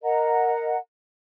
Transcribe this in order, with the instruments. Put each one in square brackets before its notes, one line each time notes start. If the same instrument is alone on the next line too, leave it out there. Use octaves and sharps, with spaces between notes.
[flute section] A#4 D#5 F#5 A#5